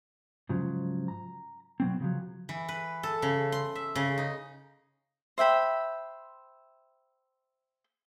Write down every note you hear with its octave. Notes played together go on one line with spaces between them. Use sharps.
G#2 C#3 F3 F#3
A#5
B2 F#3 C4
C#3 F3 F#3
E3
B4
A4
C#3
C6
E5
C#3
D#4
C5 E5 G5 B5